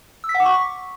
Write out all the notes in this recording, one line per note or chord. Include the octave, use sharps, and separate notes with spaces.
E6
B6
F#5
D6
C#6